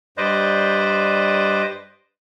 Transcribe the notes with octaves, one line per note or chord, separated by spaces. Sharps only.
G2 B4 C5 D5 D#5